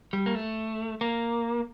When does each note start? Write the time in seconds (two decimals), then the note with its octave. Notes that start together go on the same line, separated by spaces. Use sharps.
0.13 G3
0.26 A#3
0.35 A3
1.01 A#3